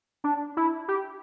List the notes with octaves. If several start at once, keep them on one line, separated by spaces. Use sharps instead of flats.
D4
E4
G4